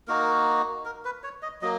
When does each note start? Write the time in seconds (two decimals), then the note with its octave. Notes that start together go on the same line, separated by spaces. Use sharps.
0.08 A#3 D#4 F#4 A#4
0.85 A#4
1.05 B4
1.23 C#5
1.42 D#5
1.62 F#3 A#3 D#5